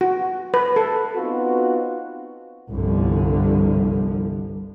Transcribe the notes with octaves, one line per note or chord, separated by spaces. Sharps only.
F#4
B4
A4
B3 C4 D#4 F4 F#4
G1 C2 D3 F3